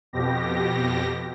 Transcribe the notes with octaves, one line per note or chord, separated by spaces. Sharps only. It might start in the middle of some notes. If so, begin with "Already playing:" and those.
F2 B2 G4 A#6